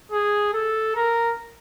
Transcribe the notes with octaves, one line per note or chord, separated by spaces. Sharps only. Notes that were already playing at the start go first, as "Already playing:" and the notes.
G#4
A4
A#4